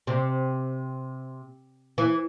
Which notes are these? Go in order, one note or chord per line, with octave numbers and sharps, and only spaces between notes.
C3
E3